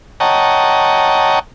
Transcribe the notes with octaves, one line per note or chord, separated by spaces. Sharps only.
C#5 D#5 F#5 G5 A5 A#5